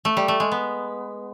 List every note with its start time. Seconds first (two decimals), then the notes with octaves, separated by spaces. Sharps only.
0.05 A3
0.17 G3
0.28 A3
0.40 G#3
0.52 B3